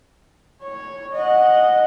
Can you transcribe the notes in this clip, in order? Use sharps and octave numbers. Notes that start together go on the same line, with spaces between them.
C#5
D#5 F#5